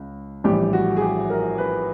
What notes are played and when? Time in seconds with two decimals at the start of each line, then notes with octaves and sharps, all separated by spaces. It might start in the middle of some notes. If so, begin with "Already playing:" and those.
Already playing: C#2
0.44 A#1 A2 E3 G3 G4
0.73 F#4
0.96 G#4
1.01 G4
1.30 A#4
1.58 B4